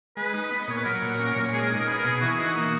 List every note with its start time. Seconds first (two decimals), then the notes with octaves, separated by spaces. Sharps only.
0.17 G#3 B4
0.34 D#4
0.51 B3
0.62 D#5
0.68 A#2 C#5
0.77 B4
0.85 F#3 A#4
1.02 A#2
1.19 C#4
1.36 A#2
1.53 G#3 G#4
1.62 A#4
1.71 D#4 G#4
1.80 A#4
1.88 B3 G#4
1.98 A#4
2.04 B2 G#4
2.21 E3 F#4
2.31 G#4
2.38 D#4 F#4
2.55 A#3